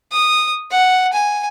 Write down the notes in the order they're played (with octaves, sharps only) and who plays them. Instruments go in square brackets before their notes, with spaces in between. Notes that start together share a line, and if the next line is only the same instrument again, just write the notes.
[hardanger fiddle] D#6
F#5
G#5